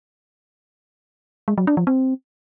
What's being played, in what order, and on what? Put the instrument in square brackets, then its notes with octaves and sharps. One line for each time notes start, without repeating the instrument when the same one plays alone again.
[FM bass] G#3
F#3
D4
F3
C4